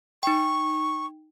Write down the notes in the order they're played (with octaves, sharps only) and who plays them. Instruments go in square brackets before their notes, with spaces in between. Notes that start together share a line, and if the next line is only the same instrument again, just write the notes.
[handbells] D#4 G5 [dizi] C#6